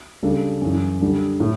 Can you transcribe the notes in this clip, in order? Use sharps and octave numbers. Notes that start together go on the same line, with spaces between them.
C#3 G3 D4 A4
F#2 C#3 E3
D3 G3 D4 A4
A2